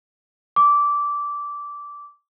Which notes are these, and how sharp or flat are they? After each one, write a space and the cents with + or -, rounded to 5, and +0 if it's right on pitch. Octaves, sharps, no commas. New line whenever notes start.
D6 -15